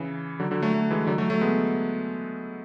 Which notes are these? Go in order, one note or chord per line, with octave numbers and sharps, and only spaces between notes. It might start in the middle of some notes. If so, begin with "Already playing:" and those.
Already playing: C#3 E3
D3 F#3
D3 F#3
F#3 A3
F#3 A3
E3 G#3
D3 F#3
F#3 A3
F#3 A3
G#3 B3